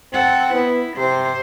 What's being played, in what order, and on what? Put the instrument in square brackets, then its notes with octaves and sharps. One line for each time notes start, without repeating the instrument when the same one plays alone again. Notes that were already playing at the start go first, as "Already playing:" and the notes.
[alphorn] C4 [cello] A4 F#5
[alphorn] B3 [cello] E4
[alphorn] C3 [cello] C5